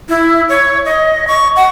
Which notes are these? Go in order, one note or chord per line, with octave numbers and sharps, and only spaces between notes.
E4
C#5
D#5
C#6
F#5